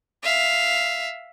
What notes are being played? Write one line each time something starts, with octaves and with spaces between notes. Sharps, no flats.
E5 F5